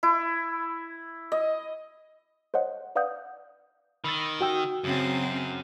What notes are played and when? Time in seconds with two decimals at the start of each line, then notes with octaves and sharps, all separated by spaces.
0.03 E4
1.32 D#5
2.54 C5 C#5 D#5 F#5
2.96 B4 D5 F5 F#5 D#6 G6
4.04 D#3 B5 E6 A6
4.41 F#4 G5 E6
4.84 F#2 C#3 C4